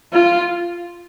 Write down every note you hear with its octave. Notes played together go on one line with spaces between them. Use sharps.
F4